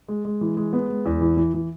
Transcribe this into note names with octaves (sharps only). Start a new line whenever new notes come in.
G#3
G#3
E3
G#3
B3
G#3
E2
E3
E3
E3